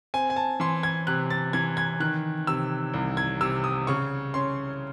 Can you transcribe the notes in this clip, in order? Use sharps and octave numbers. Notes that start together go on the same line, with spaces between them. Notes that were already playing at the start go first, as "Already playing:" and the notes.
C4 G#5
G#5
A5
E3 C6
G#6
C3 F#6
A6
E3 G#6
G#6
D#3 F#6
C3 E6
C2
G#6
C3 E6
D#6
C#3 C#6
C#4 C6